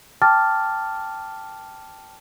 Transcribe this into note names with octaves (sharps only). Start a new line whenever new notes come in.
G5 A5 D6 F6 A6